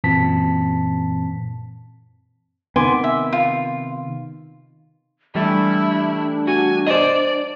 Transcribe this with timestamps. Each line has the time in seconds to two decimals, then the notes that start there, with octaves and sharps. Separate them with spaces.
0.04 F#2 A#2 E3 C4 A5 B6
2.76 C3 D#3 B3 G#5 C6 D6
3.04 E5
3.33 F4
5.35 E3 G3 A3 D4 E4
6.47 F#4 G#5
6.87 C5 D5 D#5